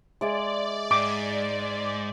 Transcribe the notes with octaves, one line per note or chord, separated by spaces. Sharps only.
G#3 D5 E5 G#5
G#2 D6